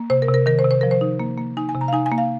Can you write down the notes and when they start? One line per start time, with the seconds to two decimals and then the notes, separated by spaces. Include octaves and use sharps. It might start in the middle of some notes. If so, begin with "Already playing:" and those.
Already playing: A#3
0.10 C3 C5
0.22 A#4
0.28 C3
0.34 A#4
0.46 D#3 A#4
0.59 C5
0.65 C3
0.71 C5
0.81 F3 A#4
0.91 C5
1.01 D#4
1.20 A#3
1.38 A#3
1.57 D#4 G#5
1.69 G#5
1.75 C3
1.81 A#5
1.88 F5
1.93 D#4 G#5
2.06 G#5
2.11 A#3
2.18 F5